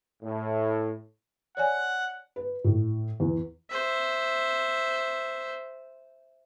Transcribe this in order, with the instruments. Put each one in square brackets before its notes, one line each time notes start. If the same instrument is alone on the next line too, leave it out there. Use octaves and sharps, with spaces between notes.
[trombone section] A2
[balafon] C#5 D5 G#5 [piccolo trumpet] F#5
[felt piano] B4
A2
E2
[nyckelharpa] C5 E5